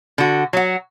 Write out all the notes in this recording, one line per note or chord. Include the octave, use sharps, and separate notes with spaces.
D3 F#4
F#3 F#4